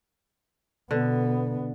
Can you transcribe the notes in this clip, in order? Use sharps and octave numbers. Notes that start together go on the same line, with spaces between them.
B2 D3 B3